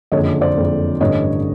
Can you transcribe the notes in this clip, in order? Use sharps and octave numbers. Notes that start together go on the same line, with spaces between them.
F#1 F2 D3 C#5 D#5
C5 D5
F#1 F2 D3
A1 G2 D3 C#5 D#5